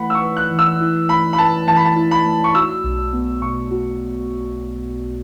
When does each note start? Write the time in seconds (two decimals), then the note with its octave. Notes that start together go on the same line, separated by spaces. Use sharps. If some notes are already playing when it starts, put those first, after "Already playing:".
Already playing: E3 A3 E4 B4 F#5 B5
0.10 E6
0.15 C#6
0.22 B4
0.37 F#6
0.51 E3
0.59 E6
0.80 E4
1.09 A3 B5
1.33 B5
1.38 B4 A5
1.68 E3 A5
1.76 B5
1.85 A5
1.96 E4
2.11 B5
2.26 A3
2.44 C#6
2.55 F#4 E6
2.84 B1
3.13 B3
3.42 B2 C#6
3.71 F#4